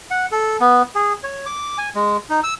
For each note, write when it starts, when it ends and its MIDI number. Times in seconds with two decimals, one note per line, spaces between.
0.11 0.26 78
0.32 0.57 69
0.60 0.82 59
0.95 1.13 68
1.23 1.46 73
1.46 1.78 86
1.78 1.89 80
1.95 2.17 56
2.30 2.40 63
2.44 2.54 88